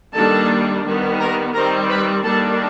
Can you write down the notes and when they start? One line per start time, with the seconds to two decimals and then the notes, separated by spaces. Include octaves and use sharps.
0.14 D#3 G3 A#3 D4 A4 A5
0.85 D#3 G3 B3
1.19 A#4 A#5
1.54 D#3 G3 C4 A#4 A#5
1.89 B4 B5
2.24 D#3 G3 A#3 D4 A4 A5